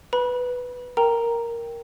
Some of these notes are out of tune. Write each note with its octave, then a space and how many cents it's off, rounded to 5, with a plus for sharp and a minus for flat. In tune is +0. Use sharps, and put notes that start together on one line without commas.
B4 +0 B5 -30
A#4 +0 G5 +0 A#5 +0